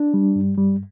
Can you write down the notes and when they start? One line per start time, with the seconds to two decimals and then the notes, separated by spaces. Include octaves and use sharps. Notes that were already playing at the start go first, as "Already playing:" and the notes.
Already playing: D4
0.14 G3
0.35 G2
0.58 G3